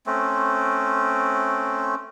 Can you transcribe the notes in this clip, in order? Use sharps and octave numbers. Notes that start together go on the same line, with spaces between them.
A3 C4 C#4